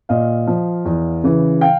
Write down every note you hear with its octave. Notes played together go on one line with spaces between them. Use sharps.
A#2 D#5 F5
F3
E2
C#3 E3
F5 G5